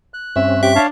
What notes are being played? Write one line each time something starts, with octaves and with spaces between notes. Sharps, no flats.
F#6
G2 C4 C#4 E5
G4 E5
D4 C#5 F5 A5